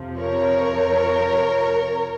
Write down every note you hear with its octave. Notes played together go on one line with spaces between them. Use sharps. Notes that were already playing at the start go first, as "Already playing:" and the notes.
Already playing: F2 C3 F3
A#4 C#5